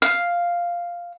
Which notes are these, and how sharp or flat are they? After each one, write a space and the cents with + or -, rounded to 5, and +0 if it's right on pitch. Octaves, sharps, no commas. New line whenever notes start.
F5 +0